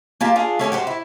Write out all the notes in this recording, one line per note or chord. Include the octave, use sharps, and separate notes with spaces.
A#3 F4 G4
D4 F4 G#4
A3 C#4 G4 C#5
F#4 G4 A4 C5
E4